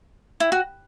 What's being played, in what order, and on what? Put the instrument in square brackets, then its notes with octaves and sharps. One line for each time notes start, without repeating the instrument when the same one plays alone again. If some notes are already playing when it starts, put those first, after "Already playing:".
[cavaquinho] E4
F#4